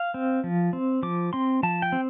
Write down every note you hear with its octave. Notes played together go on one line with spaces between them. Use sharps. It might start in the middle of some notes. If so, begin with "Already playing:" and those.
Already playing: F5
C4
F3
C4
F3 D6
C4 C6
F3 A5
G5
C4